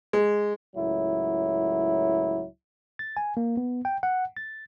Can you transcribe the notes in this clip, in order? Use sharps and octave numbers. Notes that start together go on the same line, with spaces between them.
G#3
C#2 A2 F#3 E4
A6
G#5
A#3
B3
G5
F#5
A6